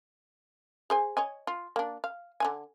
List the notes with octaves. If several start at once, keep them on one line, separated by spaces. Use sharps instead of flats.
G#4 C5 G#5
C#5 D#5 G#5
F4
A#3 D4
F5
D3 E3 G#5